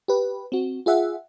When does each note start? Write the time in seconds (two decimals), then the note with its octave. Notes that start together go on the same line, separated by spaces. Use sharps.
0.08 G4 B4
0.52 C4 F#4
0.86 F4 G#4 E5 F#5